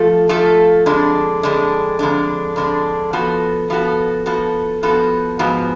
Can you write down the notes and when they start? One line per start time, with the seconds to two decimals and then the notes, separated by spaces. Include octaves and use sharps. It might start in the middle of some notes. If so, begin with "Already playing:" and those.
Already playing: F3 A3 F4 A4
0.29 F3 A3 F4 A4
0.86 F2 D3 G#3 D4
1.43 F2 D3 G#3 D4
1.99 F2 D3 G#3 D4
2.56 F2 D3 G#3 D4
3.13 F3 B3 F#4 A4
3.70 F3 B3 F#4 A4
4.26 F3 B3 F#4 A4
4.83 F3 B3 F#4 A4
5.39 G#2 F3 B3 F#4